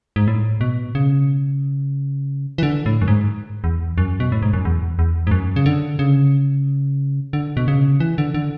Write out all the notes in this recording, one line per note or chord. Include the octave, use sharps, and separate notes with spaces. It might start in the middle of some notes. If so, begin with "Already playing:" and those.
G#2
A2
B2
C#3
E3
D3
A2
F#2
G#2
E2
F#2
B2
A2
G#2
F#2
E2
E2
G#2
F#2
C#3
D3
C#3
D3
B2
C#3
E3
D3
D3